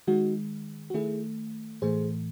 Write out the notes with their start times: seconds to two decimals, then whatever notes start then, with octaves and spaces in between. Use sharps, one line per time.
0.07 D#3 G#3 D#4 F#4
0.90 F#4
0.94 D#3 A3 E4 G#4
1.82 A2 E3 A3 G#4 C5